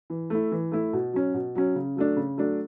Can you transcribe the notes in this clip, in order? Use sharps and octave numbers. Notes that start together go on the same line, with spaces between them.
E3
A3 E4
E3
A3 E4
B2
F#3 C#4
B2
F#3 C#4
C#3
F#3 A3 D4
C#3
F#3 A3 D4